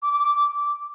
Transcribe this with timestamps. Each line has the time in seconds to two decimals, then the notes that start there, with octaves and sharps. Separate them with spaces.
0.02 D6
0.12 D6
0.23 D6